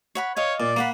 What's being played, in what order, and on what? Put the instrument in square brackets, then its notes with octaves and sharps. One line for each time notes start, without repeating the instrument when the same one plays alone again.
[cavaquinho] C#5 F#5 B5
[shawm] C#5 [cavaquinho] D#5 F5
[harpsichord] A#2 [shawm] D5
[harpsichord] A#3 [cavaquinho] F5 F#5 B5